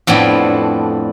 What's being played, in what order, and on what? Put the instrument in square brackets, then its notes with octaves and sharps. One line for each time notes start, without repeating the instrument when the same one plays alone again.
[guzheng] F2 A2 B3 C4 D4